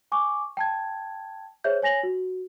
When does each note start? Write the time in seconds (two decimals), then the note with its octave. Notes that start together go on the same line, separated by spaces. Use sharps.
0.12 G#5 C#6 D6
0.57 G5 A5 G#6
1.64 G#4 C5 C#5 E5 G6
1.82 C#5 G#5 A#6 F7 F#7
2.03 F#4